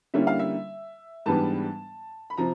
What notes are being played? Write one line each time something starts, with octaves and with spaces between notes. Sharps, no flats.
D3 G3 A#3 C#4 E4 E5
F5
E5
G#2 E3 G3 B3 D4 A5
B5
C3 F3 A#5